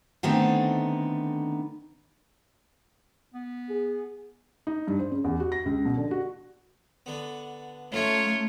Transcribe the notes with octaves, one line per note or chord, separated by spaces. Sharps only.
D3 D#3 A3 B3 C4 D#4
B3
G#4
D#4
G2
C5
C#3
E2
F#4
A#6
C#2
B2
D3
F#4
D3 B3
A3 C#4 D#4 F4 C#5